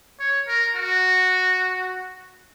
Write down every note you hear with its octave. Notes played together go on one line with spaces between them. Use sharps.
C#5
A#4
F#4